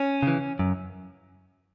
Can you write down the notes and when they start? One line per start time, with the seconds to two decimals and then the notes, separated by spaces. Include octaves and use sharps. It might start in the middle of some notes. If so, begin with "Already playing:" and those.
Already playing: C#4
0.23 C#3 E3
0.59 F#2